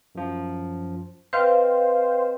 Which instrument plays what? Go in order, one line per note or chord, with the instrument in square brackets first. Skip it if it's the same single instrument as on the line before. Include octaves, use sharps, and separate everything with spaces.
[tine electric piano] F#2 F3
[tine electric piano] C4 [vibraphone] B4 D#5 G5 [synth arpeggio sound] C5 F5